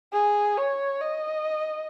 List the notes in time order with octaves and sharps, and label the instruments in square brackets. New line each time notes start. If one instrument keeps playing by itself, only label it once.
[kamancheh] G#4
C#5
D#5